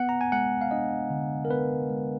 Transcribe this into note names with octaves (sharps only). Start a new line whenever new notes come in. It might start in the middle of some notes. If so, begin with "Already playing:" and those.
Already playing: B3 F#5
A#5
G#5
G#3 F#5
F5
D4 D#5
D3
A#4
B3 B4
G#3